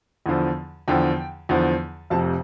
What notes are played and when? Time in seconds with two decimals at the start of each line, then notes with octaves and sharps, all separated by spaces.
0.26 E2 D3 F3
0.88 E2 D3 F3 G5
1.49 E2 D3 F3
2.10 F1 F2 C3 A5